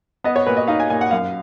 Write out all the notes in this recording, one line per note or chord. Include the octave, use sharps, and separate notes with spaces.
B3 D#5
C#5
A#2 B4
D#5
D#4 F5
G#5
A#2 G#5
F#5
F#2 F5